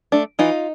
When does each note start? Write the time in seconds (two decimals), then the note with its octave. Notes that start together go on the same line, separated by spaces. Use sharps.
0.12 A3 D4
0.39 E3 D#4 F4